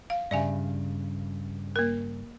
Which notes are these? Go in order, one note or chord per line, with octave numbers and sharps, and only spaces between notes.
F5
G2 C#3 D5 E5 G#5
A#3 A#4